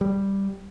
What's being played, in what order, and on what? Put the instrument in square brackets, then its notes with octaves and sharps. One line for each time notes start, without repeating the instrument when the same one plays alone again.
[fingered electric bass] G3